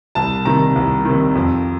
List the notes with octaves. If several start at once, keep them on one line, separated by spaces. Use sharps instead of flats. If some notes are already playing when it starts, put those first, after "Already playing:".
C2 A5
C3 D#3 A#5
C2
C3 D#3
F2